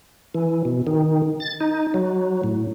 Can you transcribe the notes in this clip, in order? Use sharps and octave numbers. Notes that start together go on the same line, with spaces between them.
E3
B2
D#3
A6
D#4
F#3
A2